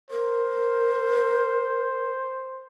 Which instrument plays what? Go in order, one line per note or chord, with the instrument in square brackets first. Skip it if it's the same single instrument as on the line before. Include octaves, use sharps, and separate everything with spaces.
[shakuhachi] A#4 [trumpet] C5